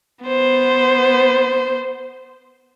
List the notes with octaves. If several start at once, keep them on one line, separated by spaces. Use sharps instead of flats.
B3 C5